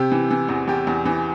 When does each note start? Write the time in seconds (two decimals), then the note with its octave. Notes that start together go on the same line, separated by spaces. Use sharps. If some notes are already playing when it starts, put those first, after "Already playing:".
Already playing: C3 G4
0.11 E3
0.30 E3
0.49 E2
0.68 E2 G4
0.87 E2
1.05 E3